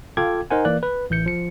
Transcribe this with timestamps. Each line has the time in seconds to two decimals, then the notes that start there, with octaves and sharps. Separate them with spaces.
0.17 F4 A4 F5 G5 D6 G#6
0.51 D#4 A#4 C5 F#5 G#5
0.65 E3 A#3 D5 F#6
0.83 B4
1.10 A1 E3 G6 C#7
1.26 F3 C#7